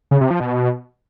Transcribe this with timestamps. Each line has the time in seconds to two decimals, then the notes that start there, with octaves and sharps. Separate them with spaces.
0.11 C#3
0.21 C3
0.30 F3
0.40 B2